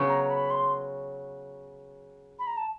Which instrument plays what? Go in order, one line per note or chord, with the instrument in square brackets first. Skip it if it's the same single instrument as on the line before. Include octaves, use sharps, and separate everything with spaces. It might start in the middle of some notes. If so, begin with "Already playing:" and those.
Already playing: [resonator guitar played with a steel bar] C#3 F#3 B3
[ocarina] A#5
B5
C6
B5
A#5
A5